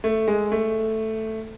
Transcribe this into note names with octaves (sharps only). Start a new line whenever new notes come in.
A3
G#3
A3